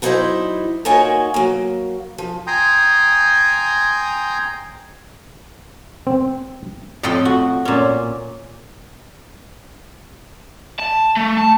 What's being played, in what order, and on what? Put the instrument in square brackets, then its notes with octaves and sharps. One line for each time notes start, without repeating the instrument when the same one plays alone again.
[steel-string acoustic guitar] F#3 D#4 E4 A4 C5 D5
A#3 D#4 F4 F#4 C#5 G#5
F#3 A#3
F3
[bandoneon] G5 G#5 A#5 C6 D#6 G6
[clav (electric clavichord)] C4
[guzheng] F2 A2 A4 D#5 G5 C6
F#4
A#2 C#4
[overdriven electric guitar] A5
A3
A5